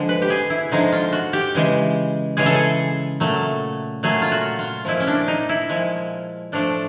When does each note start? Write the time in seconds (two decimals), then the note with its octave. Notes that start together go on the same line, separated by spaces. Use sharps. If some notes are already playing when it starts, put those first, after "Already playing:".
Already playing: D3 F3 G#3
0.09 B4
0.22 G4
0.30 G#4
0.50 E4
0.72 D3 F3 G#3 D#4
0.92 F4
1.13 F#4
1.33 G4
1.55 C#3 E3 G#3
2.37 C#3 E3 G#3 G#4
2.46 A4
2.55 G#4
3.20 A#2 F#3 A3
4.03 A#2 F#3 A3 G#4
4.22 F4
4.31 F#4
4.59 F4
4.85 A#2 F3 G#3 E4
5.00 C#4
5.07 D4
5.28 D#4
5.49 E4
5.69 A#2 F3 G#3
6.52 A2 F3 A3 D4